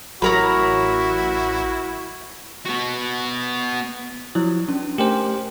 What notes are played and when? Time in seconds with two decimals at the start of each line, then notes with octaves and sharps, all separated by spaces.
0.22 A1 F#3 E4 F#4 A#4 C#5 A#5 B5
2.66 B3 F#4
4.35 F3 F#3 E4
4.69 C#4 D4
4.98 A3 G4 A#4 C5 G5 G#5